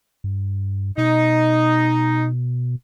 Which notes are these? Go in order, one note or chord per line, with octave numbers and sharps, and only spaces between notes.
G2
B2 D#4